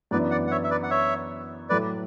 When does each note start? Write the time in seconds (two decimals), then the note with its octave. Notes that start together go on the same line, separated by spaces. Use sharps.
0.11 F#2 E3 B3 D4 B4 D5
0.31 D5 F#5
0.47 F#5
0.51 C#5 E5
0.64 E5
0.71 B4 D5
0.83 F#5
0.90 C#5 E5
1.69 A2 F#3 A3 B4 D5